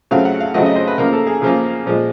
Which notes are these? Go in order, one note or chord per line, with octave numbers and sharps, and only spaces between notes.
C#3 F#3 A3 C4 F5
F#5
F5
C#3 F#3 A3 C4 D#5
D#5
C5
B4
C#3 F3 A#3 A#4
A4
G#4
C#3 F3 A#3 G#4
A#2 F3 G#3